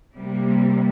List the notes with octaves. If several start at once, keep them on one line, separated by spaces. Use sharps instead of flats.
C3 G3 A#3